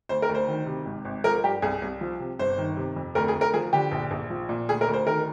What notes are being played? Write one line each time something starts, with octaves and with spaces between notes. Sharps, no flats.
D2 C5
A#4
D2
C5
D#3
C3
G#1
G#1
F3 A#4
G2 G4
C2 G#4
C2
F3
C3
G1 C5
D#3
C3
F2
D2 A#4
G#4
D2
A#4
F3 G#4
D3 G4
A#1
A#1
F3
A#2
D2 G#4
A#4
D2
C5
D#3 A#4